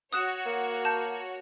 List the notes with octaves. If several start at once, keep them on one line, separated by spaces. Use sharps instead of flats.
F#4 C#5 D#6 F#6 E7
A#3
A5 G6